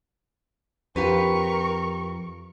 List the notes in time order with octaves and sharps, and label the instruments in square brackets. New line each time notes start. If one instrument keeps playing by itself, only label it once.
[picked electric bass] F2 [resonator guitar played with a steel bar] F4 G4 B4 [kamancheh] A#4 C#6